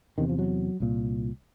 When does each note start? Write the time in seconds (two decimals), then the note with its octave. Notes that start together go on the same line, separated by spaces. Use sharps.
0.18 E2 C3 D#3
0.29 F3
0.39 F#3
0.80 C2 A#2